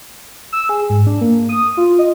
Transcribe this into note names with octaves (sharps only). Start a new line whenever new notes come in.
E6
G#4
G#2
D4
A#3
D#6
F4
D#5